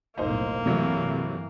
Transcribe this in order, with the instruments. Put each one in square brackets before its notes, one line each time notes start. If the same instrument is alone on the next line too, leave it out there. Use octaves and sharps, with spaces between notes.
[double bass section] F1 B1 A2 [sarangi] A#3 [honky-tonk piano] D#4 C5
[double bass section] G2 E3 [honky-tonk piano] C3 F#3 A3